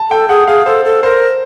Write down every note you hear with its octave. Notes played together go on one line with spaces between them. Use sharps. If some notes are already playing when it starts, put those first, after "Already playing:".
Already playing: A5
A4 G5
G#4 F#5
G#4 F5
A4 C5
A4
A#4 C5